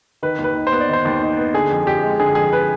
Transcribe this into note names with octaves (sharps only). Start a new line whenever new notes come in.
D#3 B4
D#2
B4
D#4
C5
B3
D5
D#3 C5
D#2
D#4
B3
D3 G#4
F2
F2 G4
G#3
D3 G#4
F2 G#4
B4